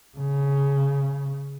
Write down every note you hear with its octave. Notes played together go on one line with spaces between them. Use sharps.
C#3